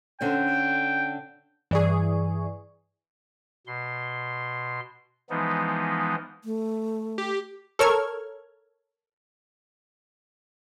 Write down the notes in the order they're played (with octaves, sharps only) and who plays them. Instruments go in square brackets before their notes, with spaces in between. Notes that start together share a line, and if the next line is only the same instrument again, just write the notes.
[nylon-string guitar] D3 C4 C#4 [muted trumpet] G5
[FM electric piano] G2 D5 C#6 [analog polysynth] E3 G#4
[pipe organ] B2 C6
E3 F3 G#3 B3 D#4
[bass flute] A3
[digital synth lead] G4
[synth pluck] A4 A#4 C#5 F6 G#6